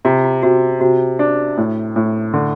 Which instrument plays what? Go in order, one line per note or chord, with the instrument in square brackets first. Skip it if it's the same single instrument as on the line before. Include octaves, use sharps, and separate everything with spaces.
[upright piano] C3 [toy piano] F4
[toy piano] F4
[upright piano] C3 [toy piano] F#4
[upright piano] C3 [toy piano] F#4
[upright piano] D4
A2
A2
D3